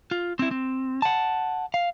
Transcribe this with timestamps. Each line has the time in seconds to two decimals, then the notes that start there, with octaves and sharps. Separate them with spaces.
0.11 F4
0.39 C4 E4
0.51 C4
1.02 F#5 A5
1.74 F5